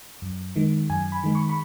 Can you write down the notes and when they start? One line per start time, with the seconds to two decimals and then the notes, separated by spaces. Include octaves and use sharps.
0.22 F#2
0.56 D#3 G#3
0.90 F#2 G#5
1.12 B5
1.24 D#3 G#3
1.35 C#6
1.49 B5